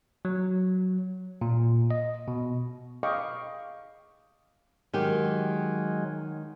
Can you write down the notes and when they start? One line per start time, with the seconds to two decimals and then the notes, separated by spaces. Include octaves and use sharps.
0.25 F#3
1.41 A#2
1.91 D#5
2.28 B2
3.03 D#5 F5 G5 B5 C#6 D6
4.94 D#3 F#3 G#3 G4